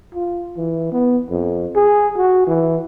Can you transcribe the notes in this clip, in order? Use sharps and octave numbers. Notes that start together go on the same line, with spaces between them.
F4
E3
B3
F2
G#4
F#4
E3